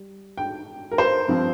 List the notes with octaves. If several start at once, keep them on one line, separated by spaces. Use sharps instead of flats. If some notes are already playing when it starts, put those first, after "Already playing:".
Already playing: G3
G5
A#4
C5
G2 F3 C4